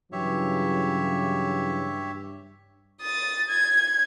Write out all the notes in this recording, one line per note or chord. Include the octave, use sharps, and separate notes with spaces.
G2 C#3 E3 F#3 G4 C#5 E5
D#6 A6
G#6